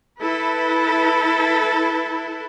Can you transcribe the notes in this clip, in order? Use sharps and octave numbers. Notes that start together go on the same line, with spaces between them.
E4 A4 B4